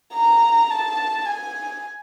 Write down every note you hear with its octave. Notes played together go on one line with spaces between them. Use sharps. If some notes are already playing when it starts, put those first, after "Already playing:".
A#5
A5
G#5